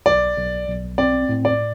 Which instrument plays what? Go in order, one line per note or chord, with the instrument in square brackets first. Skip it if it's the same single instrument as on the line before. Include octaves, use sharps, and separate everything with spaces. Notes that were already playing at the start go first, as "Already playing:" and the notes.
[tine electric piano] B1 [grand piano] D5
[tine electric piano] B1
B1
[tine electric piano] C4 [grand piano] D5
[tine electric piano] A2
[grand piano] D5